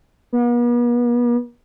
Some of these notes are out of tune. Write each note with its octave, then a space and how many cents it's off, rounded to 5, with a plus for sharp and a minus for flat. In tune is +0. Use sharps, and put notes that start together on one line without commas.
B3 -45